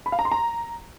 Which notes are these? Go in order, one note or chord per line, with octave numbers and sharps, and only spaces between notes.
B5
F5
A#5
C6
A#5